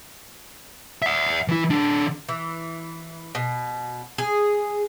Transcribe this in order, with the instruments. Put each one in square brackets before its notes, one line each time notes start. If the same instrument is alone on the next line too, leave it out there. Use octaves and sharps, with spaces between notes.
[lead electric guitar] E5 F#5
E3 E4
D#3 D4
[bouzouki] E3
B2
G#4